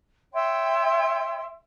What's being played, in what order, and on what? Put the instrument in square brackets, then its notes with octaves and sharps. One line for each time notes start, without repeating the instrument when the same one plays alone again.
[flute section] C#5 E5 G5 C6